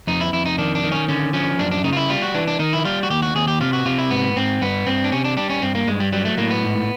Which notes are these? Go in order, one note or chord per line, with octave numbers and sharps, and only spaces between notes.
F2 D#4
E4
F2 E4
D#4
D#3 D4
D4
D#3
C#4
D3 C#4
F3 C#4
F#2 D4
D4
C#3 D#4
F4
E4
G3 F4
F#4
E3 D4
D4
D#3 D#4
E4
G3 F4
F#4
D#2 G4
F#4
D#2 G#4
G4
C3 F4
F#4
C3 F4
E4
G#2 B3
G#2 C4
G2 B3
G2 C4
D4
C3 C#4
D4
G3 D4
C#4
G2 C4
A#3
G2 G#3
G3
F#3 G3
A3
A2 A#3
B3
G#2